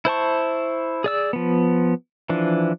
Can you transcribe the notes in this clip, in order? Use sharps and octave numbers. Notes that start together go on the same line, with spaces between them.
E4 C5 A5 C#6
G#4 D5 E6
F3 B3
E3 F3 D4